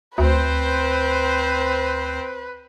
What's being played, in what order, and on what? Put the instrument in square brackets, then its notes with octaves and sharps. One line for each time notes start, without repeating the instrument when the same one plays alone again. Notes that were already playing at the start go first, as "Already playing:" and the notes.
[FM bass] D2 [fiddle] C4 C5 [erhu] B4